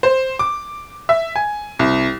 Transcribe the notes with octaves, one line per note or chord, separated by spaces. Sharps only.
C5
D6
E5
G#5
C2